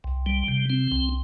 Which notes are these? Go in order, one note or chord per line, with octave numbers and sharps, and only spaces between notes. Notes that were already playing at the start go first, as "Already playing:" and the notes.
C2
G3
C3
C4
C2